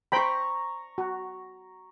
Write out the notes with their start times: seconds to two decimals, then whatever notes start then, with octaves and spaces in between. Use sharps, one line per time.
0.12 C5 G5 A#5 B5 C#6
0.98 F#4